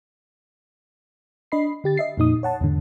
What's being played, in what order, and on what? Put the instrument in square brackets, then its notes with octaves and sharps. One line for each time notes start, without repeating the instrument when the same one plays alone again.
[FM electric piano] D4 D#5 B5 C7
D3 G4 A6
D#5 E5 C7
F2 A#2 D#4 D#6
C#5 F#5 A5
E2 G#2 D3